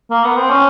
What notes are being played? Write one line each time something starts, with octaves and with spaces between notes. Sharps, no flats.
A#3
B3
C4
C#4